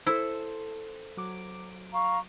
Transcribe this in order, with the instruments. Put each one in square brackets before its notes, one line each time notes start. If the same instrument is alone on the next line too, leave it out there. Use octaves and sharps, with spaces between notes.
[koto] E4 [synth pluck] A4 C5
[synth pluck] F#3 D6
[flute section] F5 A#5 C#6